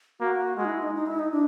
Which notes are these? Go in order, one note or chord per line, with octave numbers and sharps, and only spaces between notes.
A#3 F#4
G#3 F#4
D#4
E4
D#4
D#4
E4
D#4
D4